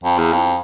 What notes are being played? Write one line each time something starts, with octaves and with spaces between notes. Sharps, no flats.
F2
E2
F2